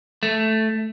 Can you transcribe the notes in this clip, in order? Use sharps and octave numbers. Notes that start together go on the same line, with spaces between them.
A3